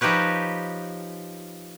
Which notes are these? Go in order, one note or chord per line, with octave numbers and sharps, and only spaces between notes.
F3 D#4 G4 B4 C#5